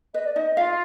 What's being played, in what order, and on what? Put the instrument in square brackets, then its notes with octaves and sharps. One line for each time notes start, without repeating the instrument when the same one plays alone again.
[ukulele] B4 [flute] D#5
[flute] D5
[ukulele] D#4 [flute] D#5
[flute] D#5
[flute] F4 [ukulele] F5